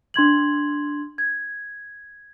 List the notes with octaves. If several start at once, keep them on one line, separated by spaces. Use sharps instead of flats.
D4 C6 G#6 F#7
G#6